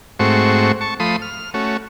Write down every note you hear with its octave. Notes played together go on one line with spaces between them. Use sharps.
G#2 A3 C4 F#4 C#6
A5 C#6
F3 A3 B5 C6 D#6
F6
A3 C#4 F#4